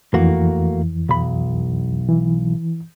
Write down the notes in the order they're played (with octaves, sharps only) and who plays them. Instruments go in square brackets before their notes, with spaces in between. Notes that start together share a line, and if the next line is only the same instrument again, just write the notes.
[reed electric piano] F2 E3 [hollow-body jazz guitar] A3 A#3 F#4
[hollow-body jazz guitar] B1 B5
[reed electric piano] E3